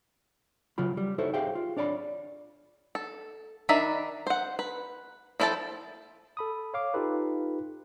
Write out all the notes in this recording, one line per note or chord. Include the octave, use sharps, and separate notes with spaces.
C#3 F#3 F4 B5
G3
D#4 E4 F#4 A4 C5 C#5
G4 G#4 E5 F5 G5
F4
D4 C#5 D5 G#5 B5
A4
D#3 D4 D#4 E5 B5
C5 F#5
B4
F3 E4 A4 G5 A5
A4 B5 D#6
C#5 F5 D6
D#4 F4 G4 A4 B4